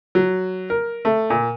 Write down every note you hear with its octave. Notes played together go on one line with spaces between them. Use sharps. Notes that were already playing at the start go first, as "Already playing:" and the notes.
F#3
A#4
A3
A#2